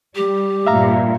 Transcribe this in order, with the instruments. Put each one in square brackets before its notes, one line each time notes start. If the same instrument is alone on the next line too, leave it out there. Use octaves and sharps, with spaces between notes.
[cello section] G3 [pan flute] G4
[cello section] G2 A#2 [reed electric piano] E5 F5 A#5